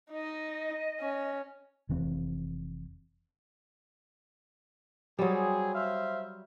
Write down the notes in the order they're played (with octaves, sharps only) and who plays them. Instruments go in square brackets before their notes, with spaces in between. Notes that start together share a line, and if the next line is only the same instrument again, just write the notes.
[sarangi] D#4 [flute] D#5
[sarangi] C#4
[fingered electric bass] F1 E3 C4
[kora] F#3 G3 [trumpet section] C4 G#4
[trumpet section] C5 E5 F5